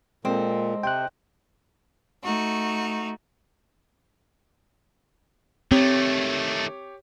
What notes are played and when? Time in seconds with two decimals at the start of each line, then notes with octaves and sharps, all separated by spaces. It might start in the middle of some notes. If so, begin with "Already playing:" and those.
0.25 A#2 G#3 C4 A4 D#5
0.83 C3 C5 G5 F#6
2.23 A3 D#4 F#4
5.72 D#3 A3 C4 G4 C#5